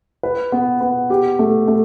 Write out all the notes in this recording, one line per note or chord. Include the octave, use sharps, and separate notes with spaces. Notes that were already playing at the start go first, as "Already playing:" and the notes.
B4
B3
B3
G4
A3
A3